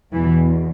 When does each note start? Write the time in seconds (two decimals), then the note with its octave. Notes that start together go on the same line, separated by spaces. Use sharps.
0.13 E2 B2 E3